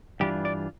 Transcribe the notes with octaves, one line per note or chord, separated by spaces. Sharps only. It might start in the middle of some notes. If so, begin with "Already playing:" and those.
G2 E3 G3 D4 F4 G4
D5